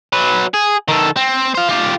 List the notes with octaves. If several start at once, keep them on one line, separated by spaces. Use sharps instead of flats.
F#3 B4
G#4
D#3 A4
C4
C5 F5
F4 G4